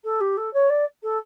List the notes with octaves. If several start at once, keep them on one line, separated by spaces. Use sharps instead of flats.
A4
G4
A4
C#5
D5
A4